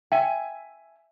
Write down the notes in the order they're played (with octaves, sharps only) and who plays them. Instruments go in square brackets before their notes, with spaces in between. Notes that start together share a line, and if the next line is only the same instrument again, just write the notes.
[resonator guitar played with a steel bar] E5 G#5 [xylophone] G5